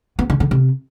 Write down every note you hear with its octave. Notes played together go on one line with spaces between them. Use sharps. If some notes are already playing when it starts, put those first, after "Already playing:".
B3
D3
D3
C3